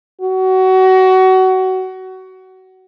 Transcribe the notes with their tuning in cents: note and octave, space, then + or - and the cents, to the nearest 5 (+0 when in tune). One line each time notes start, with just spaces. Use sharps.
F#4 +25